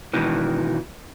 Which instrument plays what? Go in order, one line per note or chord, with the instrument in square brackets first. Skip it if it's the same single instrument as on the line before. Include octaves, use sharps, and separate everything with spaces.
[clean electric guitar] B2 D#3 E3